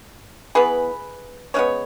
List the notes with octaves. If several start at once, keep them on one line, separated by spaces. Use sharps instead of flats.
E3 B3 G#4 B4
C#3 G#3 B3 C#5